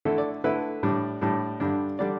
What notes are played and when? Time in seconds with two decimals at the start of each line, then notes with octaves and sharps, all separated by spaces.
0.05 D3 A3 E4 A4
0.18 D5
0.44 D3 A3 E4 B4
0.83 A2 G3 D4
1.21 A2 G3 D4
1.60 G2 D3 G3 D4
1.99 D3 G3 D4 D5